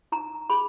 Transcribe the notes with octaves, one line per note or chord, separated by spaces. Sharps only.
D#4 A#5
G#4 B5